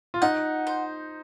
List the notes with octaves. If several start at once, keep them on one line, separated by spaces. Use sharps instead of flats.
F4
D#4 F#5
C5